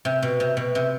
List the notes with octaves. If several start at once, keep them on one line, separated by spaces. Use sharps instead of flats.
C3
B2
C3
B2
C3